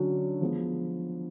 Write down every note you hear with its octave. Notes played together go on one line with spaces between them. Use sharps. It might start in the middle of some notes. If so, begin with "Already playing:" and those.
Already playing: D3 F#3 C#4 F#4
F3 G#3 B3